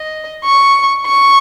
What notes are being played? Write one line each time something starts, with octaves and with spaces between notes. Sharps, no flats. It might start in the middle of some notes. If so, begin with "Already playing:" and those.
Already playing: D#5
C#6
C#6